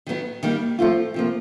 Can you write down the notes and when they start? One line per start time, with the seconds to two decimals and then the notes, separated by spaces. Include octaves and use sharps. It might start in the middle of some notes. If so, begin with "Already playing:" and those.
0.06 D#3 F#3 B3
0.43 D#3 G3 A#3
0.79 F3 A3 C4 F4
1.14 C3 F3 A#3